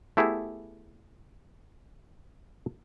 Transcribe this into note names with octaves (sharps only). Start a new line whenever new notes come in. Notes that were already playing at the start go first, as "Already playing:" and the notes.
A3 B3 E4 G4 G#4